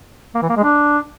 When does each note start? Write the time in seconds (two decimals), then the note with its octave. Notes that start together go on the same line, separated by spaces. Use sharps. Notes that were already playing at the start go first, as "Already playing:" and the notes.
0.35 A#3
0.42 E3
0.49 A#3
0.56 G#3
0.64 D4